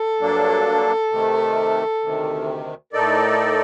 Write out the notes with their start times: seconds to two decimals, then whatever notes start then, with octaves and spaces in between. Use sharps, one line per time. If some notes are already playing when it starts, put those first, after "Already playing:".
Already playing: A4
0.19 G2 F#3 A#3 D4
1.11 C3 D#3 A3
2.02 D2 C3 D#3
2.93 A2 A3 D#4 A4 A#4 D5